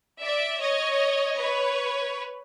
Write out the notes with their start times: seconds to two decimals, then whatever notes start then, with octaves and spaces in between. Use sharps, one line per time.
0.22 D5 E5
0.60 C#5 D#5
1.38 B4 C#5